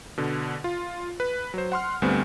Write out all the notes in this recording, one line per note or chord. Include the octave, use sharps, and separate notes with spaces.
B2 D3
F4
B4
F#3 C5
F#5 C6 F6
D2 G2 G3 A3 B3 C4